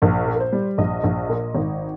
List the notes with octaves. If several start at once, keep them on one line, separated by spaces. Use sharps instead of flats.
A#1 A#4
A#2
A#4
C5
G3
A#1 D#5
A#1
A#2
G#1